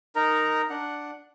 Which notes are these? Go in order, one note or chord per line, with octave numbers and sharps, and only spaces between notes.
D#4 A#4 A#5
D4 F#5